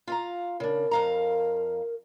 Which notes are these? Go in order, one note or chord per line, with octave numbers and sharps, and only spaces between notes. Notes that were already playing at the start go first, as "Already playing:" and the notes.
F4 F5 A#5
C#3 D4 A#4
F2 F5 A#5